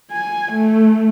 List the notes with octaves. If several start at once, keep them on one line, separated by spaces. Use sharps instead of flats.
G#5
A3